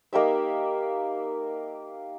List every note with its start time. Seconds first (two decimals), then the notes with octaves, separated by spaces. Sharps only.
0.13 A#3 D#4 G4 E5